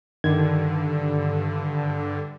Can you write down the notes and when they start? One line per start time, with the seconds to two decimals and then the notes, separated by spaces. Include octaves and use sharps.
0.24 G2 D3 D#3 G#6